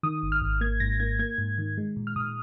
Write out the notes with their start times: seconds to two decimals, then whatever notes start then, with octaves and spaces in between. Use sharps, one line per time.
0.03 D#3 D#6
0.23 G#1
0.32 F6
0.42 G#1
0.61 A#3 G#6
0.80 G#2 A#6
1.00 A#3 G#6
1.19 A#3 G#6
1.38 G#2
1.58 D#3
1.78 G#3
1.96 A#2
2.07 F6
2.16 A#2 D#6